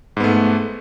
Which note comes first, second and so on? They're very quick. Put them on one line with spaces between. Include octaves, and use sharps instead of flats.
G#2 B3 A3